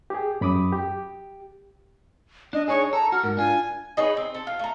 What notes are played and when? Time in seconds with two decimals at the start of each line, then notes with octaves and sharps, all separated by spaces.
0.10 G4 G#4
0.41 F#2 B5 D6 D#6
0.73 G4
2.53 D4 D#5
2.68 D4 D#4 G#4 C#5
2.93 A4 A#5
3.12 F#4 F6
3.24 G#2 A#4
3.37 D4 F4 G#5
3.97 D#4 G#4 B4 C#5
4.17 C4
4.35 A4
4.47 F4
4.59 A3 A#5